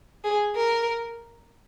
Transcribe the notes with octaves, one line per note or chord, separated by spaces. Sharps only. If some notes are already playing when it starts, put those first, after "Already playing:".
G#4
A#4